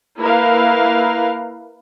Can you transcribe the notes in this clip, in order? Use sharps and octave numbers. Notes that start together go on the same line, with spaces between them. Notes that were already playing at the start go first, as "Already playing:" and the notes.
A#3 E4 A#4 B4 F5